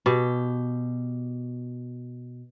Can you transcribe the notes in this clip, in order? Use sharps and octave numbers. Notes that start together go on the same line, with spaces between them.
B2 G4